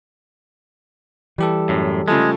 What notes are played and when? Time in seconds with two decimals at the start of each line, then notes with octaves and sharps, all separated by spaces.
1.38 E3 G3 G4 A4
1.69 F#2 A2
2.08 C#3 F3 G#3 A3